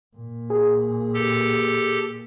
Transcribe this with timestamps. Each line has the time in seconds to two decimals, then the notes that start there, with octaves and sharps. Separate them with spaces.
0.16 A#2
0.50 G#4
1.14 G4 A4